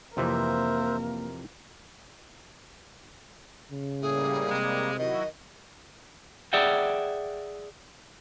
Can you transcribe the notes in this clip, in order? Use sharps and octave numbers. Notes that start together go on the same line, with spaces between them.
F2 C3 E3 A#3 A#4 C5 E5
C#3
A2 G3 A#3 G#4
C3 G#3
D#3 F#3 E4 F#4 D#5
G#4 D5 E5 F#5 G5